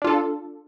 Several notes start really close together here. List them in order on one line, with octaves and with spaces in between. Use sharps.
D4 F4 A4